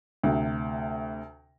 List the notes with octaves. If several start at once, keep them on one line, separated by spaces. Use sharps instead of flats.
D2 C3